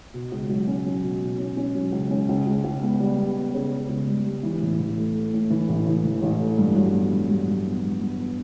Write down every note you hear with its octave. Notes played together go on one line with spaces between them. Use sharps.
B2
C#2
F#3
C#4
F#3
B2
B2
C#4
C#4
F#3
C#2
C#4
C#2
C#2
C#2
B3
G3
B3
B3
C#3
C#3
C#2
G3
G3
E3
A1
A1
A3
A3
A2
E3
A1
E3
E3
A1
A3
G2
F#3
B3
G2
G2
F#3
B3
G2
B3
B3